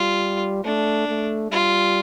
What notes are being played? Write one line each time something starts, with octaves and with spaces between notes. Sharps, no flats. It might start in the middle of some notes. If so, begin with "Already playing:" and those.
Already playing: G3 F4
A3 D4
A3
G3 F4